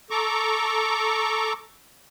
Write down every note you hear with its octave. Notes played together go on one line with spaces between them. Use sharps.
A4 A#5 C#6 D6